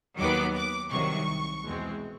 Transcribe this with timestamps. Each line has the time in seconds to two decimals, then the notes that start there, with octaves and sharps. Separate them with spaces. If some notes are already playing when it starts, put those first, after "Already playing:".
0.17 D#2 D#3 F#3 B3 D6
0.55 D6
0.90 C2 C3 D#3 F#3 C#6
1.64 E2 B2 G#3 C4